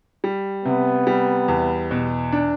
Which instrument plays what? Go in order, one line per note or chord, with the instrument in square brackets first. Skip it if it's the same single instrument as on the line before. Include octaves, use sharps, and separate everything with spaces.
[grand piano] G3
[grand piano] C3 [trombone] B3
[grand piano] G3
E2
B2
D4